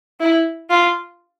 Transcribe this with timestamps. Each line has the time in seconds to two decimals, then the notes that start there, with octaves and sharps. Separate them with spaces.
0.20 E4
0.69 F4